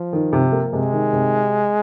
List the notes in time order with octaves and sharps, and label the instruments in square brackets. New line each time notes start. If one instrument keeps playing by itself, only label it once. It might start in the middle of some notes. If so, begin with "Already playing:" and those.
Already playing: [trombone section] F3
[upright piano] D#3
C3
A#3
[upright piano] C3 [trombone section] G#3
[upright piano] D#3
C3